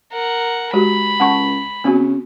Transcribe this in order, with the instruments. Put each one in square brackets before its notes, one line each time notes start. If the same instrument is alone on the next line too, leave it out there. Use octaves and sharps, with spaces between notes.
[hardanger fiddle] A#4 F#5
[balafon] G#3 F#4 G4 [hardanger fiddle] B5
[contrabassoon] C#2 [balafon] F#5 A5 C#6
[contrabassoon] C#3 [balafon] B3 C4 F#4